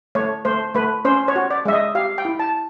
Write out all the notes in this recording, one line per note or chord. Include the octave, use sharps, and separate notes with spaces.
A3 C#5
A3 C5
A3 B4
C#4 C5
C#5
F#4
D5
G#3 E5
D#5
G4 F5
G5
E4
A5